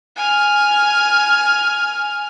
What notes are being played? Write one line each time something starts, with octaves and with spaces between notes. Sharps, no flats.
G#5 F6